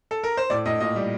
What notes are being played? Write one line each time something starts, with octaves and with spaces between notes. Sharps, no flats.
A4
A#4
C5
A2 D5
A2 D#5
A#2 D#5
G3